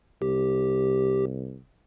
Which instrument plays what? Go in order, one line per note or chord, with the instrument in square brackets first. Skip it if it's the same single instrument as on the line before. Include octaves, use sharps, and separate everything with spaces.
[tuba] C2 [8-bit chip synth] G4